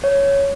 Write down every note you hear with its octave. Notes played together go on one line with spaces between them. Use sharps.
C#5